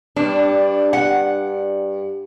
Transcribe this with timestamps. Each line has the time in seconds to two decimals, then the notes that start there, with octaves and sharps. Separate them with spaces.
0.16 G2 D4
0.93 F#5